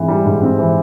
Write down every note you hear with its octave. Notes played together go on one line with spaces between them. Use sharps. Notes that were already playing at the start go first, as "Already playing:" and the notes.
Already playing: G#2 E3 C4
G3
G#2
C4
E3